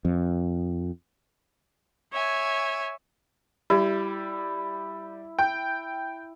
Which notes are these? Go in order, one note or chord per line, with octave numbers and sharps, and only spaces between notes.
F2
C#5 E5 G#5
G3 E4
G5